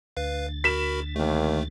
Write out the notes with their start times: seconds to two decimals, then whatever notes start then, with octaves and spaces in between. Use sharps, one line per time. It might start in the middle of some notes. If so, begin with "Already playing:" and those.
0.17 D2 B4 F5 A6
0.64 F#4 A#4 B5 B6 E7
1.16 D#2 D#3 A3